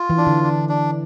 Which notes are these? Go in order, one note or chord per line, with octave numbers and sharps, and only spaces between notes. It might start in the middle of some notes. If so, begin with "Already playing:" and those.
Already playing: F4
E3
D4
D3
D4
D4